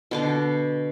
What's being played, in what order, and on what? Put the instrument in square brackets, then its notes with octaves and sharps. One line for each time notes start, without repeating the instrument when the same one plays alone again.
[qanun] B2 D3 D6